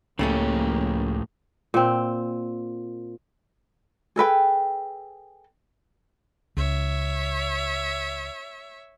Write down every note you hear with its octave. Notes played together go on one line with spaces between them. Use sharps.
C#2 A2 C#3 F3 A3 A#3 C#4 G4
A#2 C4
G#4 A4 B4 G5
C#2 C#5 E5